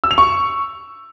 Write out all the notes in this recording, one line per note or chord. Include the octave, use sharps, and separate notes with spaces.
E6
F7
C#6